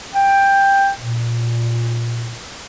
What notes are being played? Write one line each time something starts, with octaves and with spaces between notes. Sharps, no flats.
G5
A#2